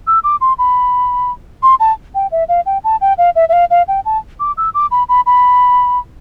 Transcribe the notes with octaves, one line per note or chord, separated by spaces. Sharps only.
E6
D6
C6
B5
C6
A5
G5
E5
F5
G5
A5
G5
F5
E5
E5
F5
F5
G5
A5
D6
E6
D6
B5
B5
B5